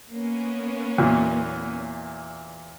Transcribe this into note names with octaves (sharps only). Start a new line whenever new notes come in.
A#3 B3 C#4
E2 A#2 F#3